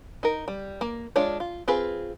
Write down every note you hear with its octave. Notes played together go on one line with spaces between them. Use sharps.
D#4 A#4
G3
A#3
G#3 D4 F4 C#5
F4
C4 F4 G#4 B4